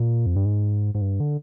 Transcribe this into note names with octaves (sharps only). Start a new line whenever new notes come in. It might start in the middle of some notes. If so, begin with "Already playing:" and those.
Already playing: A#2
F2
G2
G#2
G#2
G2
D3